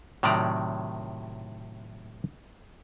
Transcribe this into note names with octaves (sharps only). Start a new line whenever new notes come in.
A2 C3 D#3 F#3 D5 A#5